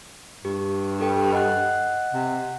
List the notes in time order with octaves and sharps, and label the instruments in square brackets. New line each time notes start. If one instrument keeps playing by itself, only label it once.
[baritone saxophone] G2 [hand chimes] G4
[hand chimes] G4 A4 G5
D#5 F#5 F#6
[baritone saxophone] C3